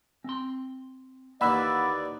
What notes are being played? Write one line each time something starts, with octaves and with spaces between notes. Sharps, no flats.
C4 C6
D#2 E3 A#3 D#4 D5 F#5 B5 E6